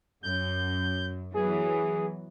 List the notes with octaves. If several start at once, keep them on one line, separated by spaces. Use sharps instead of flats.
F#2 G6
E3 F#3 B3 G#4